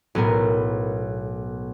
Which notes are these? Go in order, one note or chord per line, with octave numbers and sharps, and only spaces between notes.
B1 A2 B3 A#4